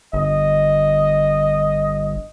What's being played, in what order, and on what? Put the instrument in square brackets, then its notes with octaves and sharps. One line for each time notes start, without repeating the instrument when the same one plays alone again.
[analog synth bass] G1 [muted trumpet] D#5